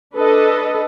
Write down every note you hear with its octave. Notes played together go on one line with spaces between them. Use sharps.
D4 A4 B4 D#5